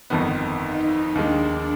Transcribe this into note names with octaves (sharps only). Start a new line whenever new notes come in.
G1 F2 D#3 B3
D#4
D#2 D#3 G#3 D4